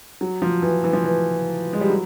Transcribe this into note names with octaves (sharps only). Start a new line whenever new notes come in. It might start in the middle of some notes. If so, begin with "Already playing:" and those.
F#3
F3
E3
E3
F3
E3
G#3
G3
F#3